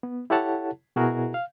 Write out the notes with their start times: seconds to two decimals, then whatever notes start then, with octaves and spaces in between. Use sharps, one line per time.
0.03 B3
0.30 E4 G4 A4 C#5 F#5 A5
0.96 B2 E4 F#4 G#4 A#4
1.34 F5